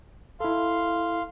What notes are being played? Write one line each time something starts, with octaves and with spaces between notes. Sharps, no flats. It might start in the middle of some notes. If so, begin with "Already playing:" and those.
E4 A4 F5 C6